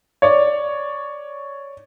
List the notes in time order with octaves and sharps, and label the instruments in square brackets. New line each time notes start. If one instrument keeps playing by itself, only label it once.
[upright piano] C#5 D5